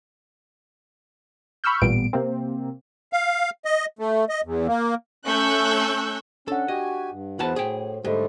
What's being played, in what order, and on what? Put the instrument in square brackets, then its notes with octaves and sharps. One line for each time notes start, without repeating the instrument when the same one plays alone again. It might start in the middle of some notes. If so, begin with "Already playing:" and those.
[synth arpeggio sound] B5 C#6 E6 F6 G6
A1 A#2 G3 B3 D7
C3 A#3 C4
[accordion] F5
D#5
A3
D#5
E2
A#3
[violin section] A3 C#4 C#6 E6 F#6 G6
[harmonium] C#4 [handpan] D4 F#5 [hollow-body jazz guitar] A4
[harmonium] F#4 G4 G#5 [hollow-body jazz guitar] D#5
[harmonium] G2
[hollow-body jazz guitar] E2 F#5 A5 [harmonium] E3 B3 B4 [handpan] F#4 C5
[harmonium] A2 [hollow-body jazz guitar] G#4 G5
[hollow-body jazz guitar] G#2 [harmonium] D3 G3 A3 [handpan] G4 C5 D#5